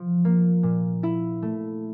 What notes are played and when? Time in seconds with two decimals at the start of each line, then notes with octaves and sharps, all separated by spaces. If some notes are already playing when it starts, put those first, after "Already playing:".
Already playing: F3
0.25 A#3
0.63 A#2
1.03 E4
1.42 A3